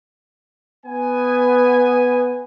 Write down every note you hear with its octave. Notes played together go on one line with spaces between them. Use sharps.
B3 G#5